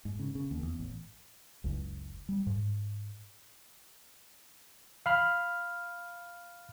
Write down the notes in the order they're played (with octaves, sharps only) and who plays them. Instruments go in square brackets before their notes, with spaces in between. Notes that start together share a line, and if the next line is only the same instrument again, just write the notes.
[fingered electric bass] G#2
C#3
C#3
D#2
E2
A1
F#1 C#2
G3
G#2
[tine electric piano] F5 B5 F6